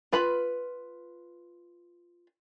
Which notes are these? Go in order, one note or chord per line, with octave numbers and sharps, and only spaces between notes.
F4 B4 B5